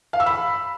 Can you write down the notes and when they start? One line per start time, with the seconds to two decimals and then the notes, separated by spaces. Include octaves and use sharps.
0.13 F5
0.20 E6
0.26 B5